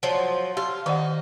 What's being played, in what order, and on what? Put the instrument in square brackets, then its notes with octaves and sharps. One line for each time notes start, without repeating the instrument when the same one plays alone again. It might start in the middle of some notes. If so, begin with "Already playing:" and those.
[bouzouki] F3 F#3
[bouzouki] F4 [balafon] G4
[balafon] D#3 D5 F#5 [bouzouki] D#4